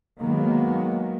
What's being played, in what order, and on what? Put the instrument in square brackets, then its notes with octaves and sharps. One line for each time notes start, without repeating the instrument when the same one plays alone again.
[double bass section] D#3 F#3 G#3 A#3 B3